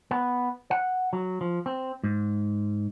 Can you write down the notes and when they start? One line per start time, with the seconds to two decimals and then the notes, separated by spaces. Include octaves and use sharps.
0.11 B3
0.71 F#5
1.13 F#3
1.41 F3
1.66 C4
2.04 G#2